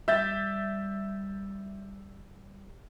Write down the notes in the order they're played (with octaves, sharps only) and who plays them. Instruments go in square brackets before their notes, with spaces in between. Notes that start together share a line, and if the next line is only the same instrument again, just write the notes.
[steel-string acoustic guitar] G3 [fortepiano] E5 [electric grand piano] E6 G6 A6